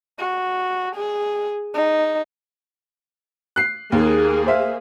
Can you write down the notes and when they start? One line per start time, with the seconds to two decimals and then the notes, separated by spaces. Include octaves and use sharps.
0.19 F#4
0.95 G#4
1.74 D#4
3.56 F#6 C7
3.92 D#2 A#3 G#4
4.47 C5 E5 F5